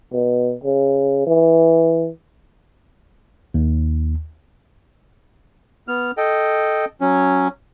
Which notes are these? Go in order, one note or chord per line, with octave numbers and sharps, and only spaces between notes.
B2
C#3
E3
D#2
B3 F6
A4 D#5 G5
F#3 C#4